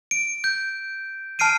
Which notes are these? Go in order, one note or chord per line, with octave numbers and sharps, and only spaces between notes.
D7
G6
A5 F6 C7 D7 D#7